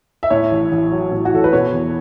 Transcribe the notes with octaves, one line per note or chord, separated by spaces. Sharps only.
E5
A2 C#5
A1
A1
F#3
A2
F#4
A1 A4
B4
B2 C#5
E2